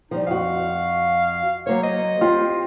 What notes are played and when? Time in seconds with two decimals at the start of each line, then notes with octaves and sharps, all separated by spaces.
0.11 F3 G3 D#4
0.27 F2 F#4 F5
1.67 F#3 A#3 C5 C#5
1.84 D#5
2.21 C4 F4 G4 F5